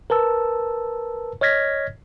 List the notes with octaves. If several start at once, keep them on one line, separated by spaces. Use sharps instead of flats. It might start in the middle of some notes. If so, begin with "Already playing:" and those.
A#4 B4 A5 E6
C#5 D#5 F6 G#6 A#6 B6